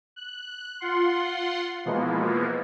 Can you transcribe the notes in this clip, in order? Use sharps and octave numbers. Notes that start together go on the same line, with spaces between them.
F#6
F4 F#5 C6
B2 E3 F3 G#3 A#3 B3